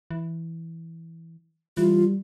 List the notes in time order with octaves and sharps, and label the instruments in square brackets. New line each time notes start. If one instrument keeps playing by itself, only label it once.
[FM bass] E3
[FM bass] E3 [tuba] G3 [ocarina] F4